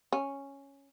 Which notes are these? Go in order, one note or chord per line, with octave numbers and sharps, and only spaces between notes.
C#4